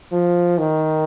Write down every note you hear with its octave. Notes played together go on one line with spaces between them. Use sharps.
F3
D#3